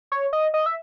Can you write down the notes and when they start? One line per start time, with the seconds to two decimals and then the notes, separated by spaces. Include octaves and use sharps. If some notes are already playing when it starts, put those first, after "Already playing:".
0.12 C#5
0.33 D#5
0.54 D#5
0.66 E5